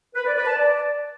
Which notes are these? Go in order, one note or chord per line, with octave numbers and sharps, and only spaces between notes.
B4
D5
B4
A5
D5